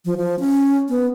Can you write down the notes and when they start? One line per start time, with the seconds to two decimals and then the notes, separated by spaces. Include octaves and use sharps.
0.05 F3
0.17 F3
0.40 C#4
0.89 B3